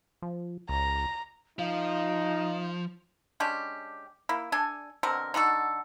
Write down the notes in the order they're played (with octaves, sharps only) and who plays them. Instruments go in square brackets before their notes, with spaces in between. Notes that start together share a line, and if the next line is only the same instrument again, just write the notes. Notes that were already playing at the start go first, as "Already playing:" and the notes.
[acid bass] F3
[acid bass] C#2 [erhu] A#5
[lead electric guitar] F3 [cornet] D#4 [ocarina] F5
[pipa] G#3 C#4 D4 G4
A#3 E4
D4 A4 G#5
B2 D3 C4 A#4
D3 D#4 F#4 A4